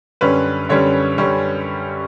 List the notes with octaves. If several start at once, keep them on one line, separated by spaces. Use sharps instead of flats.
F#2 D3 G3 C#4 B4
F#2 D3 G3 C#4 C#5
F#2 D3 G3 C#4